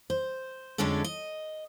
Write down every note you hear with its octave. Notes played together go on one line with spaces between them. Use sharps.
C5
F2 D3 G#3 C#4 D4 A4
D#5